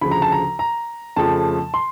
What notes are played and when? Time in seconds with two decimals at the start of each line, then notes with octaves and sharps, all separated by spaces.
0.01 D2 C#3 F3 B5
0.11 A#5
0.22 A5
0.32 A#5
0.59 A#5
1.16 F2 C#3 F3 A3 A5
1.74 C6